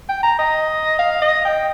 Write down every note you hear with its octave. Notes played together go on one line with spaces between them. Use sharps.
G5
A#5
D#5
F5
D#5
G5